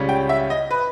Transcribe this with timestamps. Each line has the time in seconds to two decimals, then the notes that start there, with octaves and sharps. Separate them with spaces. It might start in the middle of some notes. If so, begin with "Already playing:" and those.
Already playing: C#2 C#3 G3 C#4
0.09 G5
0.29 E5
0.50 D#5
0.71 B4